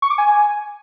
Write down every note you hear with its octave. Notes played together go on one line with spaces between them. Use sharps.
C#6
D6
G#5